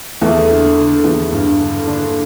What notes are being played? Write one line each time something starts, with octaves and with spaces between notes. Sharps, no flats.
E2 A3
D3
D3
E2
G2
D3
D3 D4